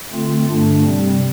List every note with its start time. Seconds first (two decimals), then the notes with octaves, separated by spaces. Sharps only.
0.12 D3 A3 C4 F4
0.48 G2 D3 A3 D4
0.84 C3 G3 C4